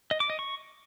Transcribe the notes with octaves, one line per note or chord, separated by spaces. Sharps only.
D#5
D6
D#5
C#6